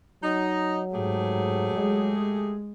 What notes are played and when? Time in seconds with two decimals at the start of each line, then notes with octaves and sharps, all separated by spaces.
0.23 F#3 D#4
0.93 G#2 A3 G4 G#4
1.73 G#3